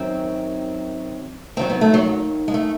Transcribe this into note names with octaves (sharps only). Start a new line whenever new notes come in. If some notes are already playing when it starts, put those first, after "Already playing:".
Already playing: F#2 D#3 F#3 C4
D#2 D#3 F#3 C4
B3
A3
F#3
G#3
A3